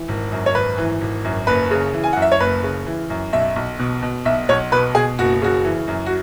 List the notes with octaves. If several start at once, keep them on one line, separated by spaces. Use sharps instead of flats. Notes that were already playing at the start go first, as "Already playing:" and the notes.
Already playing: E3
G#1
F#2
C#5
G#1 B4
E3
G#1
F#2
F#1 B4
C#3
E3
G#5
F#2 F#5
E5
C#5
F#1 B4
C#3
E3
F#2
B1 E5
B1
B2
B2
B1 E5
B1 C#5
B2 B4
B2 G#4
F#1 F#4
C#3 F#4
E3
F#2
F#4